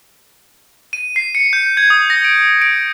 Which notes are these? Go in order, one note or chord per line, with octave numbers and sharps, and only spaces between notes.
D#7
C7
C#7
G6
G#6
D#6
A#6
D7
D7